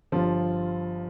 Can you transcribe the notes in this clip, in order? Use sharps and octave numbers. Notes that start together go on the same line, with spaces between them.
G1 G2 F3 F4